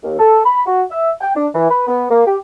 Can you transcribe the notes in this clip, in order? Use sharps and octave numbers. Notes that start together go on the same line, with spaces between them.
D#2
A4
B5
F#4
E5
G5
D4
E3
B4
B3
A#3
G4